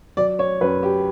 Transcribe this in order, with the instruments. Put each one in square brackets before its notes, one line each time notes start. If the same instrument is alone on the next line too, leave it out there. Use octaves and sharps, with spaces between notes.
[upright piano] F#3 D5
C#5
F#2 B4
G4